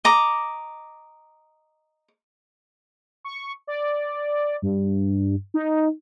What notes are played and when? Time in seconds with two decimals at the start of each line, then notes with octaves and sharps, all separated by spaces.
0.05 D#5 A#5 D6
3.25 C#6
3.67 D5
4.62 G2
5.54 D#4